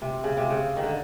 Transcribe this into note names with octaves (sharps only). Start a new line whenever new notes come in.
C3
C#3
C3
C#3
D#3
D3